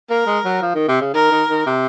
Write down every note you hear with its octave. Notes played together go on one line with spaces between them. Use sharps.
A#3 A#4
G#3
F#3
F3
D#3
C3
C#3
D#3 A#4
D#3
D#3
C3